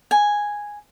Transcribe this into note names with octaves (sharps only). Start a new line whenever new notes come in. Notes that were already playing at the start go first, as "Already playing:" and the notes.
G#5